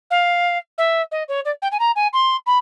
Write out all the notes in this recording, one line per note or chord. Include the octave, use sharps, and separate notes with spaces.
F5
E5
D#5
C#5
D5
G5
G#5
A#5
G#5
C6
B5